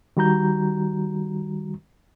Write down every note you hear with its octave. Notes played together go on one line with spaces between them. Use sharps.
D#3 G3 F#4 A#5 G6